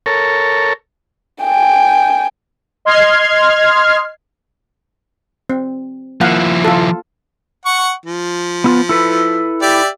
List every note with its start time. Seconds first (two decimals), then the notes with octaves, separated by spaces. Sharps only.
0.06 A4 A#4 C#5
1.43 G5 G#5
2.85 D#5 C6 F6 G#6 C7
5.50 C4
6.21 F3 A#3 E4 F5 F#5
6.64 F4 A4
7.65 F#5 C#6
8.06 F3
8.64 B3 E4 F4
8.89 E4 A4 B4
9.62 G4 D5 E5